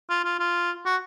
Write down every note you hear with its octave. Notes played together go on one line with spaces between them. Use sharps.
F4
F4
F4
F#4